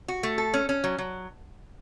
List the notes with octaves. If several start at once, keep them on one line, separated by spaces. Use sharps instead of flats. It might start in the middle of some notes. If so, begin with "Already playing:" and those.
F#4
A3
A4
C#4
C#4
F#3
F#3